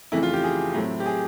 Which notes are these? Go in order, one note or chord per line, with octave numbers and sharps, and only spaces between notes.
F2 C#3 E3 A3 E4
F4
G4
G#4
A2 F#3 A3 C4
G4
G#4